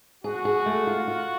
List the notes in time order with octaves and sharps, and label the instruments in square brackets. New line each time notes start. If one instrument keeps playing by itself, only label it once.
[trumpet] F#4 [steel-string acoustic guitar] G#4
[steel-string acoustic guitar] G#4
A3
F4
F4